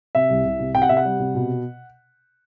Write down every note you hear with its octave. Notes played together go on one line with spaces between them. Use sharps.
C3 E5
C2
C2
C3
C3 G5
F#5
C3 E5
F#5
G3
C3
B2